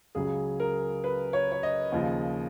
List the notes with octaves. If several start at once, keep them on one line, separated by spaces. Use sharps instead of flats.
C#2 C#3 F#3 G#4
A#4
B4
C#5
C#5
D#5
D#2 C#3 F3